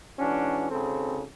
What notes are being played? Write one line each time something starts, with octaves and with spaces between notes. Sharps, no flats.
G#2 E3 C#4 D4 F#4
G#1 C#3 C4 A4